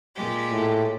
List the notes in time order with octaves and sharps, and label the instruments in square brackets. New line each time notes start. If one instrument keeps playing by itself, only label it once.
[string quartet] A#2 G#3 G4
[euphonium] A2